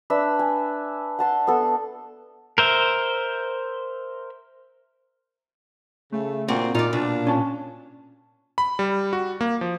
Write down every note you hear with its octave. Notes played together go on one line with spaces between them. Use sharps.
D4 B4 E5 E6
G#5
F#5 A5 C6
B3 A4
A#4 C5 E5
C#3 A3
A#2 C4 F#4
A#2 D#4 F4 D5
B2 D4
C#4 A5
B5
G3
F#4
A#3
F3